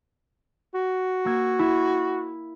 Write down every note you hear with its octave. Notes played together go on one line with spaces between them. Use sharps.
F#4
A#3 E6 G#6
E4